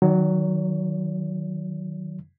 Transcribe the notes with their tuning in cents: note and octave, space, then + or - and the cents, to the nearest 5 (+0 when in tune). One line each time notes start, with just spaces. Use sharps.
D#3 -5 F#3 +0 C#5 +45